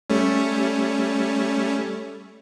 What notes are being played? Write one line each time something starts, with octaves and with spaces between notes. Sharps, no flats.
G3 A3 C#4